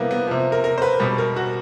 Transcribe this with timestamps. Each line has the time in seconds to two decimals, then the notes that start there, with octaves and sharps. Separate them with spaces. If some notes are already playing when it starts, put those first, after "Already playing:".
Already playing: C3 E3 G3 A#3 B3
0.11 B3
0.28 C3 F3
0.52 A#4
0.64 A#4
0.78 C5
0.82 B4
1.00 B2 G3 B4
1.18 A#4
1.36 F#4